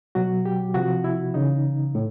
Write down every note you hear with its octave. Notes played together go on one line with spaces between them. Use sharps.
B2 F#3 F#4
G4
C3 F3 F#4
E4
C#3 E3 D#4
A2